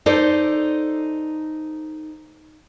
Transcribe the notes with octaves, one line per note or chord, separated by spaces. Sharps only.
D#4 A4 C5 D5